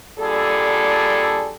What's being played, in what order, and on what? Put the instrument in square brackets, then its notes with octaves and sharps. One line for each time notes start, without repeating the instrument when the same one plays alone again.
[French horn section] A#2 D3 G3 G#4 A4